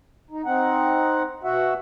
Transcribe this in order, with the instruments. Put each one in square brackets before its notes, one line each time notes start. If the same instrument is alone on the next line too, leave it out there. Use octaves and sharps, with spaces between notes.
[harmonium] D#4
C4 D#4 F#5
B2 F#4 E5 F#5